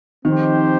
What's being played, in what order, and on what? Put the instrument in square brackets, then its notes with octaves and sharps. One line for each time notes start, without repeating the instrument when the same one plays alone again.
[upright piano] D#3 [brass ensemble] F3 C4 D#4 G4 C5